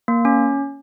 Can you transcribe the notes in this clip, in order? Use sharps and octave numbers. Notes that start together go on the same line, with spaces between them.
A#3
C#4